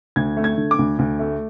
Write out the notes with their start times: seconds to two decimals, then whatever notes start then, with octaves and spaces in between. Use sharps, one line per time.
0.16 D2 G#6
0.37 A3
0.44 G#6
0.58 D3
0.71 D6
0.79 D2
0.99 D2
1.19 A3